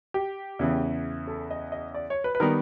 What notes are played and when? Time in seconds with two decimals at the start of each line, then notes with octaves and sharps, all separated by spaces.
0.14 G4
0.59 E2 C#3 E3
1.27 A4
1.51 D#5
1.72 D#5
1.94 D5
2.10 C#5
2.24 B4
2.35 B4
2.40 D#3 G3 B3 A#4